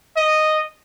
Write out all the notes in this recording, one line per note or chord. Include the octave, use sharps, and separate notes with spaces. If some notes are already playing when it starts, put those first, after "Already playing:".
D#5